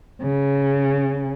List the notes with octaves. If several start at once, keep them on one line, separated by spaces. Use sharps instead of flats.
C#3